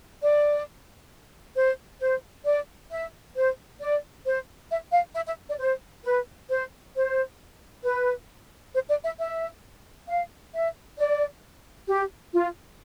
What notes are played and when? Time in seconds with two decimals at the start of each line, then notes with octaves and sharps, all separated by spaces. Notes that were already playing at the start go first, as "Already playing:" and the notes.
0.21 D5
1.55 C5
2.00 C5
2.45 D5
2.91 E5
3.36 C5
3.80 D5
4.25 C5
4.70 E5
4.92 F5
5.15 E5
5.27 E5
5.49 D5
5.59 C5
6.04 B4
6.49 C5
6.94 C5
7.84 B4
8.74 C5
8.88 D5
9.04 E5
9.18 E5
10.08 F5
10.54 E5
10.98 D5
11.88 G4
12.33 F4